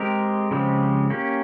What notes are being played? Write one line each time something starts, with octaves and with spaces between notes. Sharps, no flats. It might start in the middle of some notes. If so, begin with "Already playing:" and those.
Already playing: G#3 C4 G4 A#4
C#3 F3 G#3 C4 G4
A#3 C#4 G4